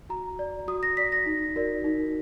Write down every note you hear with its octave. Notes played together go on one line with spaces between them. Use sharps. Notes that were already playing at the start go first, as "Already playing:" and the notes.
F#4 A#5
D5
F#4 D#6
A#6
D5 B6
A#6
D#4
F#4 A#4 D5
D#4